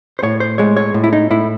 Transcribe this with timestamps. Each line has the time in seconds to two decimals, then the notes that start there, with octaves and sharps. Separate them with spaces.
0.19 C5
0.23 A2 C#5
0.40 C5
0.58 G#3 C#5
0.77 C#5
0.94 A2
1.04 E4
1.13 D#4
1.30 A2 E4